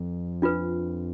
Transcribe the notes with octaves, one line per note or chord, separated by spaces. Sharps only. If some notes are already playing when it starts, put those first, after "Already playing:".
Already playing: F2
D4 F4 B4